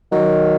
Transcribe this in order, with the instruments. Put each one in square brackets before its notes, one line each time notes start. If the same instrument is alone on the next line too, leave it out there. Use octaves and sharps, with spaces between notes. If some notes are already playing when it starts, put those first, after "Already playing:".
[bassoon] D#3 [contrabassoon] F#3